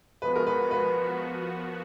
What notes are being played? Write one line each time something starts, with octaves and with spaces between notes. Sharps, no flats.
F3 G#3 B3 F#4 B4
A#4
B4
B4
F3 B3 F#4